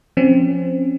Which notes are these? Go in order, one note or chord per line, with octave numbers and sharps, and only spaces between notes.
F3 C4 C#4